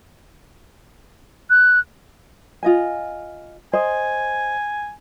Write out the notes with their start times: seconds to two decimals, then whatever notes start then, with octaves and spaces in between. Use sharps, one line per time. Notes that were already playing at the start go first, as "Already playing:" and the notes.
1.50 F#6
2.63 F4 D#5 G#5
3.73 C5 D#5 G#5